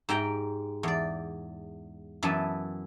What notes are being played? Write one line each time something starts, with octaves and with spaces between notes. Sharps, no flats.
G#2 G4 G5 A#5
E2 D5
F#2 E3 B3 A5